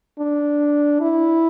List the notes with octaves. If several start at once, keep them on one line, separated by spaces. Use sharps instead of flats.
D4
E4